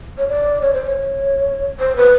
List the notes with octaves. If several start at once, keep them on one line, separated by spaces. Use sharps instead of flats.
C#5
D5
C#5
C5
C#5
C5
B4